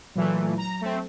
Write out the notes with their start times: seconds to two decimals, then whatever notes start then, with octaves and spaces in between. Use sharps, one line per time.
0.16 A#2 E3 F#3 A3
0.58 A#5
0.81 A3 C4